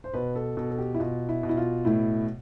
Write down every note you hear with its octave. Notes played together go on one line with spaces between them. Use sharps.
C5
B2 B4
A4
B2 A4
A4
G4
E4
B2 F4
E4
B2
E4
F4
A2 E4